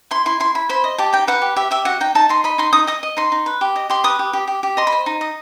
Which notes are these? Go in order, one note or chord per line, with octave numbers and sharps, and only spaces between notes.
E4 C6
E4 C6
E4 C6
E4 B5
C5 B5
D#5
G4 A5
D#4 G5
B4 F#5
G4
G4 E5
G4 E5
F#4 F#5
D#4 G5
D#4 A5
D#4 C6
D#5 B5
D#4 C6
D#4 D#6
D#5 D#6
D#5
D#4 C6
D#4
B4
G4
D#5
G4 C6
B4 D#6
G4
G4
G4
G4
D#5 C6
B5
C5
D#4
D#5